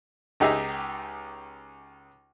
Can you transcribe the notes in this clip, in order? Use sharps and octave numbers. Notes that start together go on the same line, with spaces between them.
C#2 D#4 G4 G#4 E5 A#5